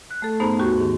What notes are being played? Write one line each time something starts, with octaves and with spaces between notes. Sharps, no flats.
F#6
A3 A4
G#2 A3 B3 D#4 C5 A#5
D#2 F#4 G4 C#6
G#2 D#3